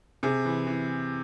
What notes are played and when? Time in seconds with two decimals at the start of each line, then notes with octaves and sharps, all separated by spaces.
0.23 C3 G#4
0.45 E3
0.67 E3